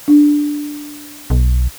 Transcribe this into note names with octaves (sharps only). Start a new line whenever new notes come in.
D4
B1